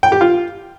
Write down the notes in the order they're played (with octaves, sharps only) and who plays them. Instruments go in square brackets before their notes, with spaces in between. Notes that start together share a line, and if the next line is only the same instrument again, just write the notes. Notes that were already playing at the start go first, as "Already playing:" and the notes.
[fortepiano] G5
G4
F4